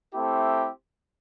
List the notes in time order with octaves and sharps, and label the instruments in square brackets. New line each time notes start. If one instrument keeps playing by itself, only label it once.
[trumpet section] A3 C4 E4 G4